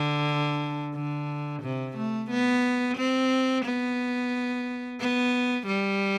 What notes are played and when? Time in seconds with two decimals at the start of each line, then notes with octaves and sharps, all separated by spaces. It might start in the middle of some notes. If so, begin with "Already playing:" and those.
Already playing: D3
0.95 D3
1.62 C3
1.97 A3
2.30 B3
2.97 C4
3.65 B3
5.00 B3
5.67 G3